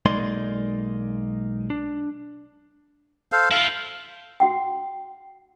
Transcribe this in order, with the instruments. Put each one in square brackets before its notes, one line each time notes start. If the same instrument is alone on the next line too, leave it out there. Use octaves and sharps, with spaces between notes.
[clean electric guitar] B1 G#3 A#3 D#4 D5 C6
D4
[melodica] A4 C5 F5
[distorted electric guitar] E4 F4 [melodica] F5
[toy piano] F#4 F#5 G5